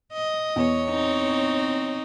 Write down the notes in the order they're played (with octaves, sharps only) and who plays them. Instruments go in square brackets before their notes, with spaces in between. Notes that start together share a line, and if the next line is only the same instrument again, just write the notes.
[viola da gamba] D#5
[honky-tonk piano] E2 [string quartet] C#5
[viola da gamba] C4 D#4